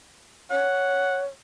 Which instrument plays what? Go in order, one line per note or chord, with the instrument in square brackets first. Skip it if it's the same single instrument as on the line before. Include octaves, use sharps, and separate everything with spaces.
[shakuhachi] C#5 [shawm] F#5